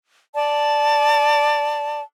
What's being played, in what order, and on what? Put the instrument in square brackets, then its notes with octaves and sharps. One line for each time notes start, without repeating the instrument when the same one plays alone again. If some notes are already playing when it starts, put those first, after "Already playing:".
[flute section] D5 A5